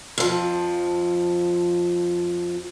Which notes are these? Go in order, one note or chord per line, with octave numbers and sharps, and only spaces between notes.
F2 F3